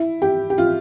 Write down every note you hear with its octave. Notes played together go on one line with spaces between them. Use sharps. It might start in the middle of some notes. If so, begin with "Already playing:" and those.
Already playing: E4
G4
G4
F4